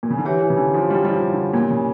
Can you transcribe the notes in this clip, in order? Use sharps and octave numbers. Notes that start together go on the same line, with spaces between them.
A#2
C#3
D3
E3 E4 G4 C#5
E3
C#3
D3
F3
G3
G3
F3
D3
A#2
C#3